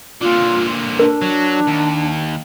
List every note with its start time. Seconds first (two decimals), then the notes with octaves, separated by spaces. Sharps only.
0.21 A#2 D3 F4
0.99 D4 A#4
1.22 F#3
1.67 D#2